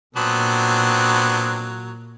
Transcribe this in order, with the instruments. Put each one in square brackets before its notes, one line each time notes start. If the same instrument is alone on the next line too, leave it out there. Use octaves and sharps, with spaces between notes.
[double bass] A#2 [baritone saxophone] F#3 [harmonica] B3 C4 D4